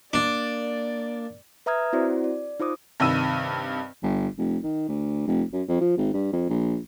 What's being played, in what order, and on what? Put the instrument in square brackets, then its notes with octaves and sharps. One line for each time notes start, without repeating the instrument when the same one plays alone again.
[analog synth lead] A#3 [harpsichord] D4 [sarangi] D5
[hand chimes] B4 E5 A#5 D#6 F6 G#6
C4 E4 F#4 C5 D5
D5
D#4 F4 C5 D6 D#6
[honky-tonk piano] G2 C3 D#3 E6 D#7
[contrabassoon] G1
F1
D#3
D2
F1
F#2
F2
F3
G#1
G2
F2
A#1